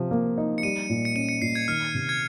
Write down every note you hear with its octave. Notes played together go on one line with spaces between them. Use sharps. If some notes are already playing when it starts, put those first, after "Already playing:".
Already playing: C3 F3
A#3
D#4
C#7
G3 D#7
A#2
C#7
C#4 D#7
C#7
A#2 C7
G#6
D#3 F6
C3
G#6